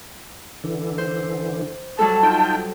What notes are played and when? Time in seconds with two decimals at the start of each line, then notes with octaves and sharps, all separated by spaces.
0.64 D3 E3
0.98 C5
1.99 F#3 G3 A4 A5
2.23 D#4 F4 G5